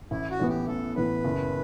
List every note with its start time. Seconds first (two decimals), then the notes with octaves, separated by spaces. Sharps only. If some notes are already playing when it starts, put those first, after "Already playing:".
0.11 A1 E4
0.30 F#4
0.39 A2 E3 B3
0.49 G4
0.68 A1 A4
0.95 A2 E3 B3 B4
1.24 F#1